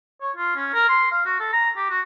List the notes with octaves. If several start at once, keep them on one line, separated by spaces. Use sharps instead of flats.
C#5
F4
C#4
A#4
C6
F5
F#4
A4
A#5
G4
F#4